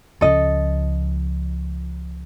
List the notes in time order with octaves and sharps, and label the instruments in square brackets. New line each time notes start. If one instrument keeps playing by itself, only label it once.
[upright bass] C#2 F3 [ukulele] A4 D#5